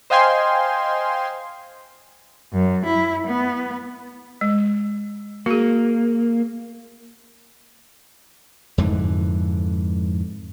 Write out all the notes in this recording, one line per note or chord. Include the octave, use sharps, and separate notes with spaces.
C5 D#5 F5 G5 G#5 C6
F#2
E4
B3
G#3
A#3 F#4 G#4
F2 G#2 D3 E3